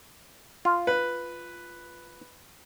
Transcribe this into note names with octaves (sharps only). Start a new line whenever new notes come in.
F4
B4